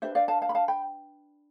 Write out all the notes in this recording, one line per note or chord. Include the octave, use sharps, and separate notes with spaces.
D4 G4 B4 C5 E5
D5 F5
F5 A5
F5 A5
B5
F5 A5
G5 B5